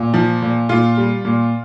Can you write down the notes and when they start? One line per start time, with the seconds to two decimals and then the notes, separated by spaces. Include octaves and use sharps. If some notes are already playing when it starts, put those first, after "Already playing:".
Already playing: A#2
0.14 F3
0.42 A#2
0.69 A#2 F4
0.97 G3
1.25 A#2